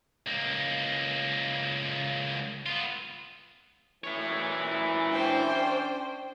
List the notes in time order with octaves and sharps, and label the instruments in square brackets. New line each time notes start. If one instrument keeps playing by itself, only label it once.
[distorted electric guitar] C#2 A#3
B3 F4
[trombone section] F#2 A#2 E3 [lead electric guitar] E4 C#5
[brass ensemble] C#4 D4 [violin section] C5 G5